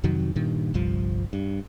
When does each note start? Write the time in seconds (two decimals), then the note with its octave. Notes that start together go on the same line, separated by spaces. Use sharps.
0.04 F2 C3 D#3 F#3
0.35 G2 A#2 D#3
0.74 G1 C2 G2 F3
1.33 G2